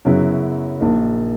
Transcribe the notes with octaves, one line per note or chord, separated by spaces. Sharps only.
F#2 C#3 F#3 B3 E4
A#1 A#2 A#3 D#4